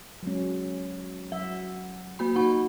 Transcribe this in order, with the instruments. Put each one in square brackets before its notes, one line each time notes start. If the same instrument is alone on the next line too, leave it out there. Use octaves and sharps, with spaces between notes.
[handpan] F#3 G#3 C#4
[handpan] F#3 E5 [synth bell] F#5
[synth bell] A#3 F#4 B5
[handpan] D#4 F#4 [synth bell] F#5 B5 C#6